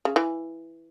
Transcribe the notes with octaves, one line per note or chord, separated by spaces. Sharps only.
C#3
E3